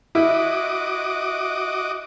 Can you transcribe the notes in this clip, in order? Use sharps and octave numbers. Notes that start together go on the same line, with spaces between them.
E4 F#4 D#5 D6